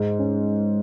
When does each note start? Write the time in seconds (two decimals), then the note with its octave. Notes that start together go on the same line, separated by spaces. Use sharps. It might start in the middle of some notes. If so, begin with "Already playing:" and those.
Already playing: G#2 G#3
0.19 C#4